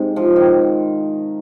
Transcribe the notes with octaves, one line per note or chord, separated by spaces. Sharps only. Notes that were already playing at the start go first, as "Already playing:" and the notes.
Already playing: G#2 C3
F3
D#3